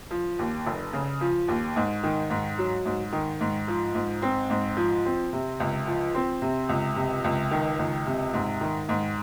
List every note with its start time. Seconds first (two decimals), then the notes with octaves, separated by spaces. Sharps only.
0.11 F3
0.39 D#2
0.67 F1
0.93 C#3
1.21 F3
1.48 D#2
1.76 G#2
2.03 D#3
2.30 G#2
2.58 F#3
2.86 G#2
3.13 D#3
3.40 G#2
3.68 F3
3.95 G#2
4.22 C4
4.50 G#2
4.77 F3
5.05 C4
5.33 C3
5.60 C#2
5.87 F3
6.15 C4
6.42 C3
6.69 C#2
6.96 C3
7.24 C#2
7.51 D#3
7.79 C#2
8.06 C3
8.33 G#2
8.61 D#3
8.89 G#2